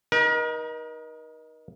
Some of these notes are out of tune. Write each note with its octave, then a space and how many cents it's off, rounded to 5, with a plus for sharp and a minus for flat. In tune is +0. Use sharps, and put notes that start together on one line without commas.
D#4 +0 A#4 +40